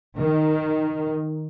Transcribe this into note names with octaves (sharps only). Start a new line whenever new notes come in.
D#3